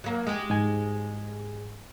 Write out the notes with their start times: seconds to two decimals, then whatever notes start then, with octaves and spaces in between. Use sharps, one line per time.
0.04 F#3 A#3
0.27 G#3 G4
0.50 G#2 G#5